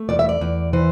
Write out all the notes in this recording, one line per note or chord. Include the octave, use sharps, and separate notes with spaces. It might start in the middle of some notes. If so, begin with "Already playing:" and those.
Already playing: A3
E2 D5
E5
D5
E2
E3 C5